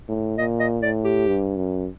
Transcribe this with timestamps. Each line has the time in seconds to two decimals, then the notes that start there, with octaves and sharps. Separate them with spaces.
0.08 A2
0.38 A#2 D#5
0.60 D#5
0.83 A2 D5
1.04 G4
1.27 G2
1.57 F#2